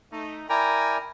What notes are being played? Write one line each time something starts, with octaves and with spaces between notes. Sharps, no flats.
A3 D#4
E4 A#4 D5 G5 G#5 A#5